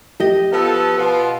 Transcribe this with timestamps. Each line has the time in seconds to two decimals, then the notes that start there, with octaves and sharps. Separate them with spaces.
0.20 G4 D#5
0.52 F3 B3 A4
0.97 B2 B3 F4